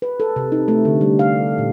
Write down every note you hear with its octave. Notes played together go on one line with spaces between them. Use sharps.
B4
A4
C3
D#4
A3
D3
G3
F5
A#2